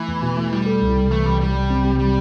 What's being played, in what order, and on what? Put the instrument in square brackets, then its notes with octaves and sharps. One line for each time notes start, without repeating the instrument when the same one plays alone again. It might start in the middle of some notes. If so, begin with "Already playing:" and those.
Already playing: [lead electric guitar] E3 [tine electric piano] A3
[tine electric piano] E2
B2
A3
[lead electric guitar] G3 [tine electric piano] E4
[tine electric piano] A4
C2
C3
[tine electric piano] E3 [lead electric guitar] A3
[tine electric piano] C2 [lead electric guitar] G3
[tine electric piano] C3 [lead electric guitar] G3
[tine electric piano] F#3
C4
C3
[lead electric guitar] G3